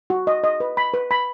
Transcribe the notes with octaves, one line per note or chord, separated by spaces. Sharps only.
F#4
D#5
D#5
B4
B5
B4
B5